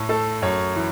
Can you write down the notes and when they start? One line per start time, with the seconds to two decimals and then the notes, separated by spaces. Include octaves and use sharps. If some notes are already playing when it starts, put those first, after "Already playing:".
Already playing: A2
0.09 A3 A4
0.42 F#2 C#5
0.76 E3